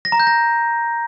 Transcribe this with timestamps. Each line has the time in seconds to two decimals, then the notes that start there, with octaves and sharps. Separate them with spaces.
0.05 A#6
0.12 A#5
0.20 G6
0.27 A#6